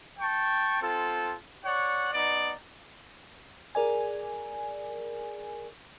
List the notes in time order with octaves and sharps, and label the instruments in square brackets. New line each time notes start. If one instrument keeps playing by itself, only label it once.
[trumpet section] G5 A5 C#6
C4 F4 A4
C#5 D5 F#5
B3 D#4 D5
[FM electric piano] G#4 A#4 D5 G#5